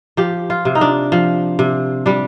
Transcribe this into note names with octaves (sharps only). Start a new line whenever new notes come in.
F3 G4
F4
C3
D#4
D4
F3
C3
G3 D4